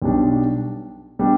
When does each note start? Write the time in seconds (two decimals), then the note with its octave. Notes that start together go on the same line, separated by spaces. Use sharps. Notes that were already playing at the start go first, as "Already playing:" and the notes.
0.02 B1 B2 G3 D4
1.19 B2 G3 D4 G4